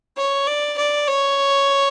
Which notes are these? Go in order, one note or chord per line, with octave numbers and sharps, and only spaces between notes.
C#5
D5
D5
C#5